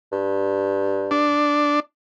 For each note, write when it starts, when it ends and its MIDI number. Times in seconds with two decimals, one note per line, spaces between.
0.12 1.30 43
1.11 1.80 62